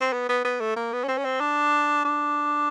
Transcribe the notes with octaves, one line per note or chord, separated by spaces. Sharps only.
C4
B3
B3
B3
A3
A#3
B3
C#4
C4
C#4
C4
D4
D4